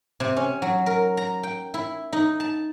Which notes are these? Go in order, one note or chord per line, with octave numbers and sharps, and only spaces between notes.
C3
C#4
F#3
A#4
A#5
G5
E4
D#4
A5